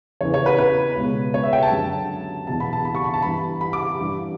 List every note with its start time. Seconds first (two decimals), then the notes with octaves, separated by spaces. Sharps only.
0.21 E2 C#3 E3 C#5
0.34 C#5
0.46 B4
0.59 B4
0.97 C#2 B2
1.34 C#5
1.43 E5
1.53 G5
1.62 A5
1.72 F#2 D3
2.47 E2 B2 A5
2.60 B5
2.73 A5
2.85 B5
2.95 C#6
3.04 B5
3.14 A5
3.22 G2 E3 B5
3.61 B5
3.73 D6
3.98 G2 E3